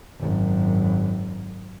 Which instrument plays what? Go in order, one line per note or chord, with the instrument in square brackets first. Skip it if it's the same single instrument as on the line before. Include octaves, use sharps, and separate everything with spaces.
[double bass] G#1 F#2